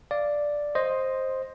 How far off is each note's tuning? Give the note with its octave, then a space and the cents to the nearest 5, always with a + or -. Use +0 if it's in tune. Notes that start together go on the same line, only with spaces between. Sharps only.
D5 +0 F5 -15
C5 +10 D#5 +0 C6 +0